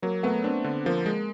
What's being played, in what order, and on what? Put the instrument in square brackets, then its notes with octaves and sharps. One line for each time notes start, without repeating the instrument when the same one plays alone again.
[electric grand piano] F#3 [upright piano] A#3
[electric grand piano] A3 [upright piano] B3
[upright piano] C4 [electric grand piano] D4
[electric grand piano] D3
[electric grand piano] F3 [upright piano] A#3
[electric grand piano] G#3